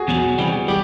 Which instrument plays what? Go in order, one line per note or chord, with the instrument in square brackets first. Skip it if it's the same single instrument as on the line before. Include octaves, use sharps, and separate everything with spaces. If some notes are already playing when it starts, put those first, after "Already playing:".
Already playing: [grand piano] F#4 G#4
[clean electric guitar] E2 B2 F#3
C3 E3 G3
[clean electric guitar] G3 [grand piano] G4